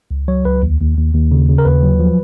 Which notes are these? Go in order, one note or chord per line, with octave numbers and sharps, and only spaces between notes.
C#2
F#3 C#5
C#2 B4
D#2
D#2
D#2
D#2
C#3
C#3
A#4
D#2 B4
F#3
F3